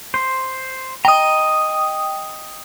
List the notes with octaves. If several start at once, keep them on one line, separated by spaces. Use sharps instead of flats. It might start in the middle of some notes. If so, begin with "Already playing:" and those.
C5
D#5 G5 A#5 D#6